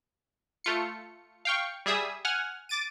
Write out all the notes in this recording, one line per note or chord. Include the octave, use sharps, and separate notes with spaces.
A3 F4 C#7
F5 G5 C#6
G3 G#4 E5 D#6
F#5 G#5 F6
D6 A6 D7 D#7